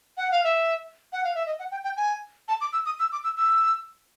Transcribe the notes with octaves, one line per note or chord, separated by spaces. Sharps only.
F#5
F5
E5
F#5
F5
E5
D#5
F#5
G5
G5
G#5
A5
D6
E6
D#6
E6
D6
E6
E6